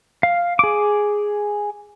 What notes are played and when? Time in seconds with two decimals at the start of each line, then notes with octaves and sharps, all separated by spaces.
0.23 F5
0.59 G#4 D6